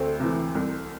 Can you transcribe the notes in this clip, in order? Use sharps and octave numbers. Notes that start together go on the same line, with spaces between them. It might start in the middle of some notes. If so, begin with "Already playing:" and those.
Already playing: D2 A3 C4
C3 E3
C2